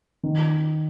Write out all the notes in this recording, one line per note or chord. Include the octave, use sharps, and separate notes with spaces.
D#3